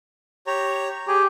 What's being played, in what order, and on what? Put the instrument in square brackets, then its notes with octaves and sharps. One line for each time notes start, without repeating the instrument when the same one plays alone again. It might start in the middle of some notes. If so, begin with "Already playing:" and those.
[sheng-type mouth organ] G4 C#5 A#5
[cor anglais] G4 [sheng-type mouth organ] G#4